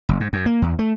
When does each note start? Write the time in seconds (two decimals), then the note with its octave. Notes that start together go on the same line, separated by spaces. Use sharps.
0.09 F#1
0.20 G#2
0.33 F#2
0.46 A#3
0.62 E2
0.79 A3